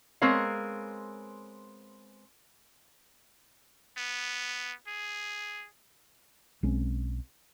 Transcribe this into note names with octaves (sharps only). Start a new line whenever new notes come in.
G#3 B3 C4 A#4 C#5 F5
B3
G#4
B1 G#3 C4 C#4